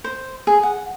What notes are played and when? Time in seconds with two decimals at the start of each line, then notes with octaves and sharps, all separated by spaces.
0.04 C5
0.47 G#4
0.63 F#5